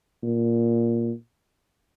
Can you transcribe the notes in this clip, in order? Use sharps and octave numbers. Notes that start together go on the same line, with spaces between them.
A#2